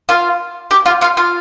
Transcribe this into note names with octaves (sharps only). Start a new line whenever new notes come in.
F4 F5
G4 G5
F4 F5
F4 F5
F4 F5